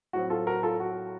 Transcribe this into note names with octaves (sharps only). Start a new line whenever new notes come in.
A2 F#3 C4 F#4
F4 A4
F#4 A#4
F4 A4
F#4